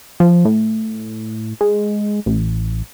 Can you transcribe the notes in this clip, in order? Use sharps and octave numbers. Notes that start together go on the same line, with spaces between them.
F3
A2
G#3
A1